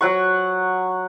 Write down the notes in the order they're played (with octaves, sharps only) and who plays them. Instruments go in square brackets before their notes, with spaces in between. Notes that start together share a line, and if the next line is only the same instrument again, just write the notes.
[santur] F#3 F#5 C#6